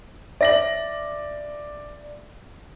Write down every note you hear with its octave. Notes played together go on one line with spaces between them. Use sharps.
D5 E5 A#6 F#7